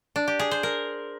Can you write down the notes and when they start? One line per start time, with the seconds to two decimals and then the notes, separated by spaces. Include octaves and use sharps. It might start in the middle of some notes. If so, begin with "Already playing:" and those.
0.16 D4
0.28 G4
0.40 G#4
0.51 C5
0.63 A#4